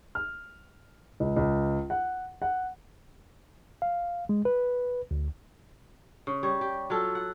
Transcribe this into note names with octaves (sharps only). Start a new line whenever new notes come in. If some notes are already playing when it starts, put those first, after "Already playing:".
F6
C#2
C#2
F#5
F#5
F5
G#3
B4
D2
C#3
G3 C#5
G4
F#3 F4 A4
F#5